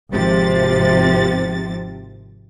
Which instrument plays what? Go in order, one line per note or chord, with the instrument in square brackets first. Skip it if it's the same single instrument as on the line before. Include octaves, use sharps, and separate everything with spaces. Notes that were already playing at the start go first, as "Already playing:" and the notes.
[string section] G#1 C3 F3 A6